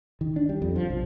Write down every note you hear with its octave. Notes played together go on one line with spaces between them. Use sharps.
D#3
D4
G3
F2
F3
B1